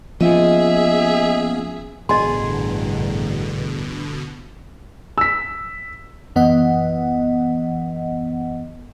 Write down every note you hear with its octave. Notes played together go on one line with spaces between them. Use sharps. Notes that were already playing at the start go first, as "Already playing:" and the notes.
F3 A#3 B3 C#4 G#4 D#5 E5
A1 G2 B2 D3 G#4 D#5 C6
E6 B6
F#2 E3 B3 D#5 F#5